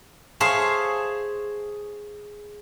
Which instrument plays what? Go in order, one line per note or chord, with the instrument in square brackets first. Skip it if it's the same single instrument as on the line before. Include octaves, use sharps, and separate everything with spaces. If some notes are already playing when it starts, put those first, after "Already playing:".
[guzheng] G#4 C5 C#5 E5 F5 A5